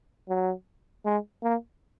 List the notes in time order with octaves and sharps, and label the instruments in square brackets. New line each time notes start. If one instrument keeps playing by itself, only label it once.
[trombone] F#3
G#3
A#3